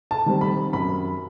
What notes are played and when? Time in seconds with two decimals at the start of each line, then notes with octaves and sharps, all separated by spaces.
0.11 A5
0.26 D#3 G3 C4
0.41 B5
0.73 F#2 B5